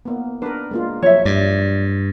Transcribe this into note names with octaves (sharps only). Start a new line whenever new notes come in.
A#3 B3
D4 A#4 B4
G#3 A#3 F4
F3 F#3 C#5 E5
G2 D5